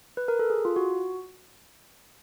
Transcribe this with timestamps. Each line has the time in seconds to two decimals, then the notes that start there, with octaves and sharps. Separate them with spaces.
0.17 B4
0.28 A#4
0.39 A4
0.50 G#4
0.65 F4
0.76 F#4